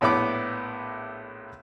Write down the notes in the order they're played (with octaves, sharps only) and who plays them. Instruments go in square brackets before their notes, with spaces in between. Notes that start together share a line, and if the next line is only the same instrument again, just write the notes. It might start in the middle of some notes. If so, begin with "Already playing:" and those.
[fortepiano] A#1 A2 B3 E4 B5 D6